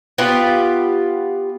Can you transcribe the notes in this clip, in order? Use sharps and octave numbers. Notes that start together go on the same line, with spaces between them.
B3 F4 G4